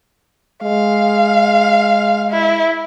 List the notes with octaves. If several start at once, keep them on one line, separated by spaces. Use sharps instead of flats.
G#3 F5
E4